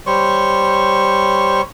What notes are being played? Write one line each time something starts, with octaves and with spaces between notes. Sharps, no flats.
G3 C5 C#5 C#6